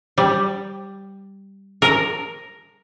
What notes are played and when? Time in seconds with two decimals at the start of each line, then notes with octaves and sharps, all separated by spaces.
0.18 G3
1.82 A#4